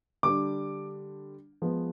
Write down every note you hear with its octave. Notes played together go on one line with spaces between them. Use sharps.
D3 G3 D4 D6
F3 G#3 B3